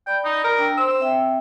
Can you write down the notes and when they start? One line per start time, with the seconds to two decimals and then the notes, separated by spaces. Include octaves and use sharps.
0.07 D5 G5 B5
0.25 D#4
0.44 A#4
0.58 D4 G5 E6
0.77 C5 C6 E6
1.00 C4 E5 G5